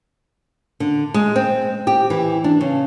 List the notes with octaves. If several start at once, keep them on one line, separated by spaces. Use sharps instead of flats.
D3
G#3
C4
G4
E3
D4
C#3